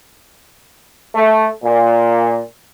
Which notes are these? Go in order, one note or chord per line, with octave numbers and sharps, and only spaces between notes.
A3
A#2